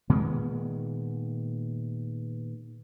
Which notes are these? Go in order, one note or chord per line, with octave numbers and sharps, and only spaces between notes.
A#2 D#3 G#3 B3